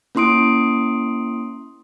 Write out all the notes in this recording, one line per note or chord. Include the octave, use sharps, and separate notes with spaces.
A#3 C#4 E4 C6 D#6 D7